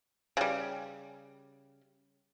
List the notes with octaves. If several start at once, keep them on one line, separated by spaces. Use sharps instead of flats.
C#3 G3